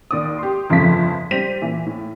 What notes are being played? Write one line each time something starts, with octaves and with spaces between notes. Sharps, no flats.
D#2 D5 D#6
G4 C6
G1 F2 C#3 F3 A3 B6
G3 C5 A#6 B6 D#7 F7
A#2 E3 E5
A2